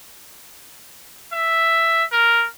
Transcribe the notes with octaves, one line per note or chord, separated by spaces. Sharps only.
E5
A#4